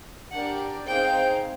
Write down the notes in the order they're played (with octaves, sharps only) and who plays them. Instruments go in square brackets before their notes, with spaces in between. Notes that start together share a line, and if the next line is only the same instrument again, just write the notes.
[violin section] D4 G4 A#4 D5 [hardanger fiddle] F#5
[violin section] C4 D#4 G#4 C5 F5 [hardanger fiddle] G5